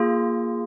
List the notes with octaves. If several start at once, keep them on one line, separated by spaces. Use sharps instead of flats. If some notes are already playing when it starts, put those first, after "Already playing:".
Already playing: A#3 F4 G#4